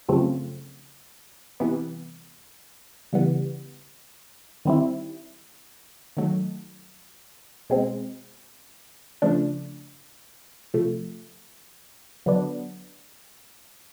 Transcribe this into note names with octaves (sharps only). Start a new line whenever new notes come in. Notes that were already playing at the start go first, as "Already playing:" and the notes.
F#2 C#3 F3 A3 C4
C3 E3 G3 B3
C#3 E3 G3 B3
D#3 G3 C4 E4
D#3 F#3 A3
B2 G#3 C4
C#3 F3 A3 D4
C3 F3 A3
D3 F#3 B3 D4